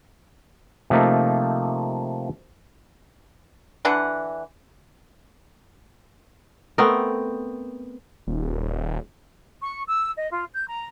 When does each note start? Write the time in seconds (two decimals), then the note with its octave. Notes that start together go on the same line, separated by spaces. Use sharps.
0.90 C3 F3 A3 A#3 D#4
3.85 D3 E3 D4 F#5
6.78 A3 B3 C4 A#4
8.27 D#1
9.62 C#6
9.88 E6
10.17 D#5
10.31 F4
10.52 G6
10.68 A#5